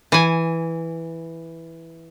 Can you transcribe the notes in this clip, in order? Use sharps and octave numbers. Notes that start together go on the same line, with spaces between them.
E3 G#5